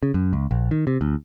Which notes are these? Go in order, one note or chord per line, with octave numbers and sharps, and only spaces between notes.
C#3
F#2
C#2
A#1
D#3
C3
D2